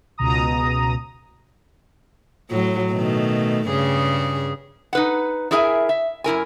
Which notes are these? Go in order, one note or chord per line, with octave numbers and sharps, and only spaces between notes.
C#2 B2 A#5 D#6
A2 F#3
B2 D#3 A3
G2 C#3 G#4
D#4 B4 F#5
D4 E4 G#4 A#4 E5 G#5
E5
F#2 E4 A#4 G#5